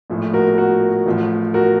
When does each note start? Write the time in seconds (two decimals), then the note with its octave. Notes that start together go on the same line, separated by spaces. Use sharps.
0.10 A#1 A2 F3
0.34 F#4 A#4
0.58 F#4 A#4
1.06 A1 A2 F3
1.54 F#4 A#4